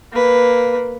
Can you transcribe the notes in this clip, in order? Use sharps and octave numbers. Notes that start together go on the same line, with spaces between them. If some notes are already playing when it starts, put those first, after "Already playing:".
A#3 B4